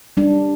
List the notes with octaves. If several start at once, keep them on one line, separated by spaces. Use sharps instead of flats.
G3 D4